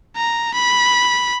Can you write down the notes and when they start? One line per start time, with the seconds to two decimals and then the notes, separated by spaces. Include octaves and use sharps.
0.16 A#5
0.54 B5